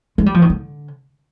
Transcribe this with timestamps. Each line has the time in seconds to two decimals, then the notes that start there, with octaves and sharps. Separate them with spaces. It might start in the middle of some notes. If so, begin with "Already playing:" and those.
0.18 G#3
0.26 G3
0.34 F3
0.42 D#3
0.50 D3